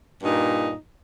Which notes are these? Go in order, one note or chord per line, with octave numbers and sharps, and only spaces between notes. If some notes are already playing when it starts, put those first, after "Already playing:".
G2 A#2 D#4